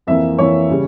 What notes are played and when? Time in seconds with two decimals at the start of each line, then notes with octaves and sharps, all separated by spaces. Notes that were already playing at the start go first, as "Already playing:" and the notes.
0.07 F2 E3 A#3 E5
0.38 F2 E3 A#3 C#5
0.70 C#3 G3